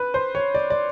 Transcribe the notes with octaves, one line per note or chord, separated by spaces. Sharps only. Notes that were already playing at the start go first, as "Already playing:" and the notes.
Already playing: B4
C5
C#5
D5
D5